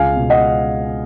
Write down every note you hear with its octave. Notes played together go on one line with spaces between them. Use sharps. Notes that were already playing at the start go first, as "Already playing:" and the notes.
Already playing: C#2 F5 G#5
B2
D#5 F#5